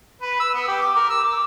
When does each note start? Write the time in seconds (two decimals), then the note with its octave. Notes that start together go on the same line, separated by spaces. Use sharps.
0.22 B4
0.40 E6
0.54 B3
0.68 G4
0.82 D6
0.96 A#4
1.10 E6
1.24 D6